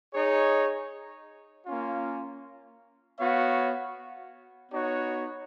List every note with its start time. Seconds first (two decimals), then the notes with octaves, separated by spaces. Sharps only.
0.14 D#4 G#4 C#5
1.67 A#3 C#4 F4
3.19 B3 F#4 C#5 F5
4.72 B3 D#4 F#4 C#5